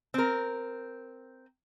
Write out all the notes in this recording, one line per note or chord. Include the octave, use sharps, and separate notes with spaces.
C4 A#4